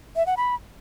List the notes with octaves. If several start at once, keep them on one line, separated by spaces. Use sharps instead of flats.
E5
F#5
B5